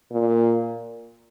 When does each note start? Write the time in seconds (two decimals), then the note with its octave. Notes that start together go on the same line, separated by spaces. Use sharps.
0.12 A#2